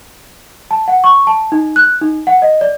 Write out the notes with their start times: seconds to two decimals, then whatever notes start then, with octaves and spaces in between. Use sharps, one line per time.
0.71 A5
0.88 F#5
1.04 C#6
1.27 A5
1.52 D#4
1.76 F#6
2.02 D#4
2.27 F#5
2.42 D#5
2.61 D5